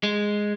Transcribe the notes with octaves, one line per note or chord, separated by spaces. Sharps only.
G#3